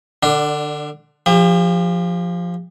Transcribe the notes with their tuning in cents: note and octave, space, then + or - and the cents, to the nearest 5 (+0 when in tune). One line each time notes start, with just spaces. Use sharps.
D3 +30 D4 +0
F3 +0 G4 +40